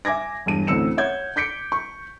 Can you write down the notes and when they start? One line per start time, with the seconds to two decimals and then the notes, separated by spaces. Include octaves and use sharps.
0.05 E5 G#5 D6 G#6 A#6
0.46 E1 G2 D#7
0.67 A1 D2 C4 E6 C#7 E7
0.97 C#5 E5 F#5 G6 G#6
1.36 D6 G6 B6 C#7 D7
1.72 C#6